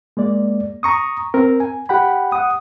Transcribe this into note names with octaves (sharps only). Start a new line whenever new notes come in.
G#3 A#3 D5
A#5 C#6 D#6
C4 A#4
G#5
G4 F#5 G5 B5
F#5 D#6